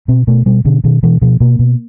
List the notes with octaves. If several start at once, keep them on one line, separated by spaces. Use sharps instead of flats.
B2 C4
B2 A3
B2 G3
B2 D3
B2 D#3
B2 E3
B2 F3
B2 A#3
B2